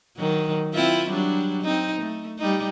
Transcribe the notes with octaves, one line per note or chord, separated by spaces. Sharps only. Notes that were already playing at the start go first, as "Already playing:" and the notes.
D#3 F#3
C4 E4 F4
F#3 G3 D4
C4 D#4
A3
G3 D#4